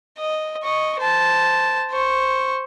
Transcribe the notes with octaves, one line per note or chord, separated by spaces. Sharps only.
D#5
D#5 C#6
C5 A5
C5 C#6